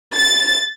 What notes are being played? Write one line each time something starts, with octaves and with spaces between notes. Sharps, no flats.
A6